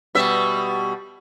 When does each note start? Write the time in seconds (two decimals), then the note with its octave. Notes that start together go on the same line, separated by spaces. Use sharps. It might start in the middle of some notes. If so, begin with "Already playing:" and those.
0.15 B2 G3 E5